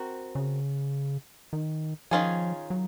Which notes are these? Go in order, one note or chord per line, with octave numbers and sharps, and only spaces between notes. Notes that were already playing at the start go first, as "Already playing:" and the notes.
Already playing: C4 F#4 A#4
C#3
D#3
D#3 F3 A#3 C#4 F4 G#4
F#3